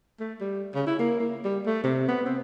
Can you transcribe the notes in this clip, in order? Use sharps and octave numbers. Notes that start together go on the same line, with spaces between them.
A3
G3
C#3
E4
A#3
A#3
G3
A3
C3
B3
C4